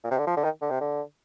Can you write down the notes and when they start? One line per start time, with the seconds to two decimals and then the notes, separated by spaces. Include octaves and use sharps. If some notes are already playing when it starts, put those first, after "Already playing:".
0.04 A#2
0.11 C3
0.18 D3
0.27 F3
0.37 D3
0.44 D#3
0.62 D3
0.71 C3
0.80 D3